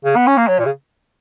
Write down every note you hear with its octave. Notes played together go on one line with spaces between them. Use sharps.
C#3
B3
C#4
A#3
F#3
A#2
C#3